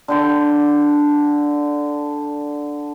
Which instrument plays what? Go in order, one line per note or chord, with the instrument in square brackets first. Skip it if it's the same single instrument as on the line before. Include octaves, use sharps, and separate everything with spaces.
[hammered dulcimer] D3 G5 C6